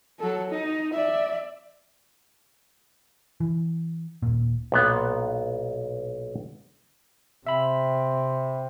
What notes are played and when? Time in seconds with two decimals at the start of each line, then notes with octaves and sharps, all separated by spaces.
0.19 F#3 A4
0.50 D#4
0.94 D5 E5
3.40 E3
4.22 D#1 A#2
4.72 B1 A#2 B3
7.47 C3 C4 E5 B5